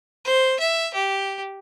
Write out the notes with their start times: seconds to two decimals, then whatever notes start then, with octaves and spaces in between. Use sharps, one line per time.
0.25 C5
0.60 E5
0.94 G4